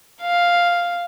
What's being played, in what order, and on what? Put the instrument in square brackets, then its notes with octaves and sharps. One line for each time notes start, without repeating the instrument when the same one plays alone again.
[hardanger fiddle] F5